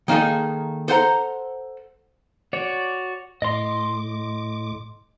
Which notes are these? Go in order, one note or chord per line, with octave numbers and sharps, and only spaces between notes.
D#3 A#3 D#4 G#4 A4
A4 C5 F#5 A#5
F#4 C#5 D5
A2 D#5 C6 D6